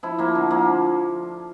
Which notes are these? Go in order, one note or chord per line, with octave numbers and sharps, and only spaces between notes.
F3 E4
F3 A#3
D3
F3 A#3